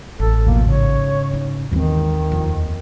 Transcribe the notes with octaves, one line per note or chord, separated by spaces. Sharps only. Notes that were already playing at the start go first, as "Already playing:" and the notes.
A1 A4
D2 B2 F3 A#3
G#2 C#3 C#5
D#4
D#2 D#3 E3 G#3 B3 C4
F2